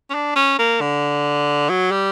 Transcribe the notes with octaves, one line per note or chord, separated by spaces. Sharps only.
C#4
D4
C#4
A#3
D3
F#3
G3